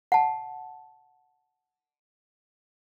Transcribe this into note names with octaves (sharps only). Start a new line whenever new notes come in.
F#5 A5